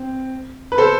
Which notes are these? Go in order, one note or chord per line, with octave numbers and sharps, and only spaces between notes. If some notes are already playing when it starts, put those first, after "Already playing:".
Already playing: C4
B4
A4 C5